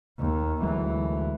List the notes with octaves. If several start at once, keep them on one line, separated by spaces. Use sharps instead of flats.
D#2
D2 E3 F#3 G#3